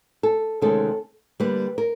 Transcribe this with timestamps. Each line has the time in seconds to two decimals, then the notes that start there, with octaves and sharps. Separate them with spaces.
0.23 A4
0.61 D2 C3 D#3 G#3 C#4 A4
1.40 D3 G3 A#3 B4
1.78 A#4